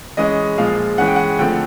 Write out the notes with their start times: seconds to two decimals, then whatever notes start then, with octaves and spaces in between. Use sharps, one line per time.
0.17 E3 G#3 C#4 D#5
0.58 A#2 F3 G#3 F5
0.98 E3 G#3 C#4 F#5
1.07 G5
1.16 F#5
1.39 D3 F3 A3 C4 G5